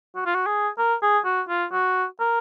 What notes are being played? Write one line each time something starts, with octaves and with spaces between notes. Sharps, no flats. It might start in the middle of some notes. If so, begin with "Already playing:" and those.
F#4
F4
F#4
G#4
A#4
G#4
F#4
F4
F#4
A#4